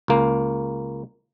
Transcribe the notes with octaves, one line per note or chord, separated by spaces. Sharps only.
C#2 A#3